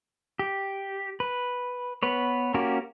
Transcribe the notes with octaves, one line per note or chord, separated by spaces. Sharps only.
G4
B4
B3 B4 C#5
A#3 C#4 F#4 G4 A#4